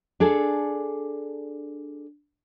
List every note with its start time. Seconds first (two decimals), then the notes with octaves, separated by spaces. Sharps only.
0.20 D4 G#4 A4